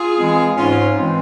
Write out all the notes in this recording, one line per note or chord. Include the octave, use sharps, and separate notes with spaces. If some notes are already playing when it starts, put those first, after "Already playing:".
Already playing: F4 G#4
E3 G#3 C4
G#2 C#4 F4
E3 G#3 C4